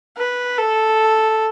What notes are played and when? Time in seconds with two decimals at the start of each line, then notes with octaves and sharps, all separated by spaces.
0.17 B4
0.58 A4